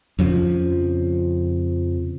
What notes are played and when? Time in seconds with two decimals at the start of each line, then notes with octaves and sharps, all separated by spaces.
0.19 F2 C#3 F3